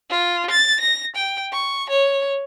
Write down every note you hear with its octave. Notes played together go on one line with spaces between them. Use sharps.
F4
A6
A#6
G5
C#6
C#5